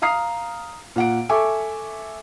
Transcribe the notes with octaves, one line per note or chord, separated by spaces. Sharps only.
F5 A#5 D#6 F6 C7
A#2 F#5 D7
A4 E5 G#5 C#6 D6